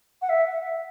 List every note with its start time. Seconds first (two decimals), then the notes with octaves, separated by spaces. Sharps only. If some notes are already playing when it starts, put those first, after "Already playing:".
0.22 F#5
0.29 E5